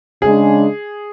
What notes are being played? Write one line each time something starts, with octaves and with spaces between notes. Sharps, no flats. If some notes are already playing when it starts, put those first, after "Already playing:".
C#3 G#3 D4 G#4